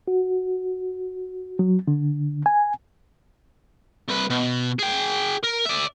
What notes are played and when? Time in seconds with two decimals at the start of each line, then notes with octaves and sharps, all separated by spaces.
0.08 F#4
1.59 F#3
1.88 D3
2.46 G#5
4.09 C2 B4
4.30 B2
4.79 G#4 G5
5.44 A#4
5.66 D5 E5